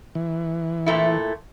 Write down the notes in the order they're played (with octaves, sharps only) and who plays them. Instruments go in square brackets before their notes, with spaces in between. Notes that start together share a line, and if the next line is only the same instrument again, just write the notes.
[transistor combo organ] E3
[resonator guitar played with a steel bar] A#2 A3 E4